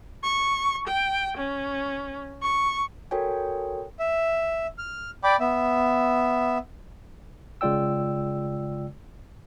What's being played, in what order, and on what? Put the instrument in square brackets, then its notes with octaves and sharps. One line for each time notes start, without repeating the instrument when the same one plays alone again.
[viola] C#6
G5
C#4
C#6
[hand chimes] F#4 A4 A#4 C#5 G5 G#5
[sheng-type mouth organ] E5
F6
D5 G5 B5 D6
B3 E5
[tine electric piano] C#3 G#3 F4 D5 G5 E6